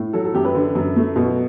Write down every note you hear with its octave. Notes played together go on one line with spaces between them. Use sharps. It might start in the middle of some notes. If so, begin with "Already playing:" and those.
Already playing: A2
F#3 A4
A4
F#2 G4
B4
D3
F#2
A3
B2